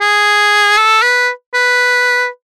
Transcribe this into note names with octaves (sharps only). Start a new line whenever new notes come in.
G#4
A4
B4
B4